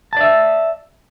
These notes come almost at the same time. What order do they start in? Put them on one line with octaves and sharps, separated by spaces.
A5 D5 E5